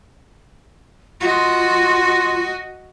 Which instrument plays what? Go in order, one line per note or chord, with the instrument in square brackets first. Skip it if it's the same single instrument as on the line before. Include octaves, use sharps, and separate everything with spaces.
[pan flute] F4 [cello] F#4 D#5